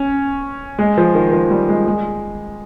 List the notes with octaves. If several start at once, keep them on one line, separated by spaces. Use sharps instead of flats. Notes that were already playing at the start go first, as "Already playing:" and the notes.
Already playing: C#4
G#3
F3
D#3
F3
G3
G#3
G#3